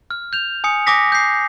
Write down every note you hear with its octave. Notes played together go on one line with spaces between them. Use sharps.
F6
G6 F7
G#5 D#6 C#7
G#5 D6 D#6 A#6 B6
G6 C7